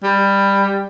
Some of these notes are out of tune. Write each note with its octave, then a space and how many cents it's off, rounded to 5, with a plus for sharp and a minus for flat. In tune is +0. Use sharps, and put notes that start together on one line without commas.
G3 +15